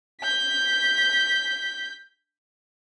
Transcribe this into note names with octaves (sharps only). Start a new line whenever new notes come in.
G6 B6